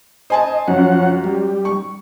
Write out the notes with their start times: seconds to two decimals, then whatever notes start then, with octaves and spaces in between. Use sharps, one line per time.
0.30 C5 D#5 G#5 A5
0.68 F#2 F3 C#4 F#5
1.24 G3
1.65 C#6